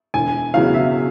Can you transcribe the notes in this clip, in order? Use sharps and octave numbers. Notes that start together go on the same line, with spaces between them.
E1 G#5
E2 C#3 F#3 B3 F5
E5